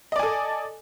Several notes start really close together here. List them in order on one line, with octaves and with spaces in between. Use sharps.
D#5 D5 G#5 A4